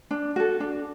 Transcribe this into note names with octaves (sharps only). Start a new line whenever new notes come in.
D4
F#4 A4
D4